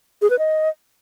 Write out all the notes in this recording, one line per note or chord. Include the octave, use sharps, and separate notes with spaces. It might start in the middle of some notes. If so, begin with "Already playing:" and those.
G#4
B4
D#5